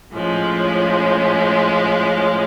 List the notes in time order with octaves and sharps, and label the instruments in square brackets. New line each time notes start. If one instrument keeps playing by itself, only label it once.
[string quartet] A2 F3 G#3 C#4